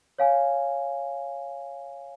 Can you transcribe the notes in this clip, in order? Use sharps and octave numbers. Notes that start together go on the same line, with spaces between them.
C#5 F5 G#5